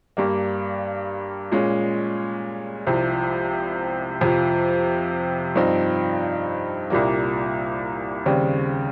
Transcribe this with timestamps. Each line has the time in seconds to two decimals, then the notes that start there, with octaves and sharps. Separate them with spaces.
0.17 G2 G3 A#3
1.52 A#2 G#3 C#4
2.87 C2 C3 F3
4.21 F2 C3 F3
5.56 G2 F3 C4 D#4
6.90 C2 A#2 G3 A#3
8.26 D#2 C#3 G3 C4